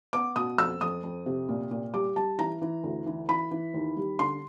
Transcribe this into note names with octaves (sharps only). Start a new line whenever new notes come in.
B3 D6
B2 D#6
F2 E6
F2 D#6
F2
C3
A#2
A#2
G3 D6
G3 A5
E3 A#5
E3
D2
E3
E3 B5
E3
D#2
G3
D3 C6